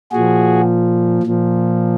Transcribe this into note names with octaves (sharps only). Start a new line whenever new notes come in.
A#2 F3 F#4 G#4
A#2 F3